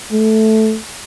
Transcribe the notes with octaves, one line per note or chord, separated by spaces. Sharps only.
A3